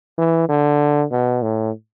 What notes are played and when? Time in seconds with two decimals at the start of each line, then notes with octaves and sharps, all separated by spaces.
0.18 E3
0.49 D3
1.11 B2
1.42 A2